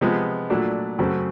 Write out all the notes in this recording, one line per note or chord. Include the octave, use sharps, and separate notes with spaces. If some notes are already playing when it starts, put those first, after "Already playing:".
C3 F3 G#3 B3
A#2 F#3 A3 D4
F#2 C#3 F#3 A3 C4